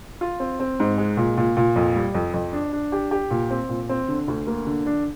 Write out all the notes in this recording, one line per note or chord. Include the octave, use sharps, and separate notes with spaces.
F4
C4
C4
G#2
G#3
A#2
A#2
A#2
F2
G3
F2
F2
D4
D4
G4
G4
A#2
C4
A#2
C4
D3
D2
A#3
D3
D4